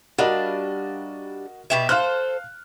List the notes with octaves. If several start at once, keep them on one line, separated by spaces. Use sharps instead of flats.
G3 D4 F#4 A#4 D#5 F5
B2 G4 E5
A4 C5 F5 F6 F#6